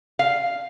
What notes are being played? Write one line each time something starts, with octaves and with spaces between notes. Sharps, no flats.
F5